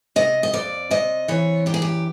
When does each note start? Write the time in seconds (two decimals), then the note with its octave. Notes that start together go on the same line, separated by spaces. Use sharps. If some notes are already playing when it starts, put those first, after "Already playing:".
0.16 C3 D#5
0.43 D#5
0.53 F2 D5
0.91 C3 D#5
1.28 E3 C#5
1.66 F#2 G4
1.74 G#4
1.82 G4